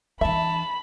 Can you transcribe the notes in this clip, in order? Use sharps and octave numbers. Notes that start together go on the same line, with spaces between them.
E3 D4 E5 A5 B5